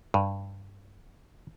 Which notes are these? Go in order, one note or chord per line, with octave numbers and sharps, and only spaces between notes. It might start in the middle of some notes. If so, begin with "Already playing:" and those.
G2